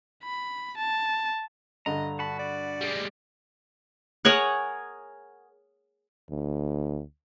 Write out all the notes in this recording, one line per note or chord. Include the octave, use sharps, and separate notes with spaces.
B5
A5
G2 D3 D#5 A#5
F#4 A5 B5
D5
G3 G#3
G#4 A#4 C#5 F#5
D2